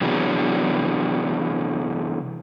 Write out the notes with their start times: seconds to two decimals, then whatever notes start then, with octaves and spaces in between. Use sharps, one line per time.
0.01 C3 E3 F#3 B3 D4 G#4